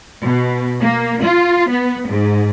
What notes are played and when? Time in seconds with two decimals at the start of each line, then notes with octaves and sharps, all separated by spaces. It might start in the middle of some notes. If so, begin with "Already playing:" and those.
0.23 B2
0.81 A#3
1.22 F4
1.69 B3
2.08 G#2